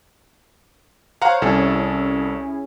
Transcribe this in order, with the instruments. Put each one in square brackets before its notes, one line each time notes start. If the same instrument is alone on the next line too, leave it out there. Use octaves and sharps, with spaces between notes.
[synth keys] C5 C#5 [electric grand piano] F5 F#5 A#5
[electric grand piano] C2 A4 [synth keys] C#4 E4 G#4